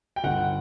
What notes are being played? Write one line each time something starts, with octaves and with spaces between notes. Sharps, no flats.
G5
G1 F#5